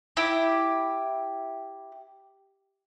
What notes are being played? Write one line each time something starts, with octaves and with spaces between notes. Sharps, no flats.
E4 G4